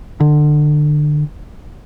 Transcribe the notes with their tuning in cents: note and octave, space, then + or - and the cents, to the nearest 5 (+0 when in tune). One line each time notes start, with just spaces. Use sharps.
D3 +25